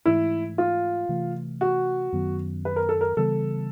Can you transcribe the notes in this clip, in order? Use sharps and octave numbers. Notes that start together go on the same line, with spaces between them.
G#2 E3 A3 E4
F4
C3 E3 A3
F#4
F#2 D#3 F#3 B3
B4
A#4
A4
A#4
C#3 E3 G3 B3 A4